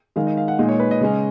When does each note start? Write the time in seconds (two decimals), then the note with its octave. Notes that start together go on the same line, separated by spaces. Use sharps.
0.16 D#3 G#3 D#4 F5
0.27 D#5
0.37 F5
0.48 F#5
0.59 A#2 G#3 D#4
0.69 C#5
0.80 B4
0.91 D#5
1.01 C#3 G#3 C#4